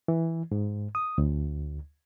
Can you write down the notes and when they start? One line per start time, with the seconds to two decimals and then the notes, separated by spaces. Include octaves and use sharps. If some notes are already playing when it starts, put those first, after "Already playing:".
0.08 E3
0.52 G#2
0.95 D#6
1.18 D2